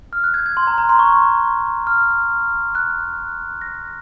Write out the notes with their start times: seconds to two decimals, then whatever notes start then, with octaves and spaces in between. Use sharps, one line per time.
0.13 F6
0.24 F#6
0.34 G#6
0.46 G#6
0.57 C6
0.67 A#5
0.78 A#5
0.89 C6
0.99 C#6
1.87 F6
2.75 F#6
3.62 A#6